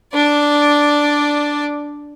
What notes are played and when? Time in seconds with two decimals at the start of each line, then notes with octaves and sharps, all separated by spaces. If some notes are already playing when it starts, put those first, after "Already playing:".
0.14 D4 D5